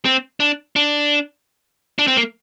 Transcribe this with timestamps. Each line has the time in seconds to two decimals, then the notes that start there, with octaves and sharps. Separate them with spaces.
0.05 C4
0.40 D4
0.76 D4
1.99 D4
2.07 C4
2.16 A#3